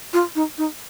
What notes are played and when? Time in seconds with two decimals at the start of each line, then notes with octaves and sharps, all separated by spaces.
0.13 F4
0.35 D#4
0.58 D#4